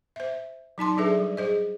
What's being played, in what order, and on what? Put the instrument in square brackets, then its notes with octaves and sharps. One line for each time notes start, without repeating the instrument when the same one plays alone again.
[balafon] C5 E5
F#3 D#4 A5 C6
F#3 D4 G#4 A4 B4 E5
G3
G#4 C5 D#5